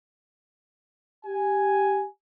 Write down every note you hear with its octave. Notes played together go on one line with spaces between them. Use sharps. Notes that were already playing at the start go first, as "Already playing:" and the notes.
G4 G#5